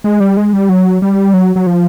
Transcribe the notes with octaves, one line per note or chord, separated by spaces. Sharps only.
G#3
G3
G#3
G3
F#3
G3
F#3
F#3
F3